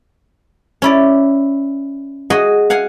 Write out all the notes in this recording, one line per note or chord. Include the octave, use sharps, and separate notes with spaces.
C#4 E4 D5
F#4 G#4 D#5
F5 F#5 G#5